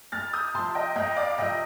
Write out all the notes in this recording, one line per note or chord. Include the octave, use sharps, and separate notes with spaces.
F2 F6 A6
D#6 G6
C3 F3 A5 C6
D#5 G5
F2 D#5 G5
D5 F5
C3 F3 D#5 G5